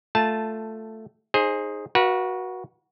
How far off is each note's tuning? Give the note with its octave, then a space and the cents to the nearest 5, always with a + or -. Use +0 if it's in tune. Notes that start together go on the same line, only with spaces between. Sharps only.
A3 +5 F4 +10 A5 +0
D#4 +0 G#4 +0 C5 +25
F#4 +0 B4 -40 F5 -30